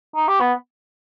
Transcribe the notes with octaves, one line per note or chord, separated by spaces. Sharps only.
D#4
G4
B3